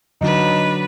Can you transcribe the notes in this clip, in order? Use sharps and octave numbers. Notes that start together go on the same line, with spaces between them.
D3 F#3 D4 D#4 F#4 B4 B5